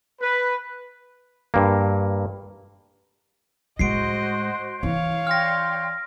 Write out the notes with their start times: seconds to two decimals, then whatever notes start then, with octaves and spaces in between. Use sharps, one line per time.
0.21 B4
1.54 G2 A#3
3.79 A2 G#3 F#4 C5 D#5 C6 C7 D7
4.83 E3 E4 C#5 F5
5.27 D5 G5 C6 F6 A#6